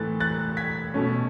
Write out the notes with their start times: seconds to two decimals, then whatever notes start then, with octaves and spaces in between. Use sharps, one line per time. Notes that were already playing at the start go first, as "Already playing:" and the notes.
Already playing: A2 E3 A3 F#6 A6
0.20 F#6 A6
0.57 G#6 B6
0.94 B2 A3 C#4